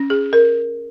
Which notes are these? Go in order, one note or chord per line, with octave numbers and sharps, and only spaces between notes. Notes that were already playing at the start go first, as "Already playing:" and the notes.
Already playing: C#4
G#4
A#4